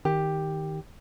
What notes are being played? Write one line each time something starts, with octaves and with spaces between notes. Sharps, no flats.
D#3 G4